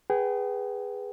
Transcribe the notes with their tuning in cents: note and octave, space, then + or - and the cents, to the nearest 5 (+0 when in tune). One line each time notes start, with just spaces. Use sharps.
G#4 -15 B4 +0 G5 -45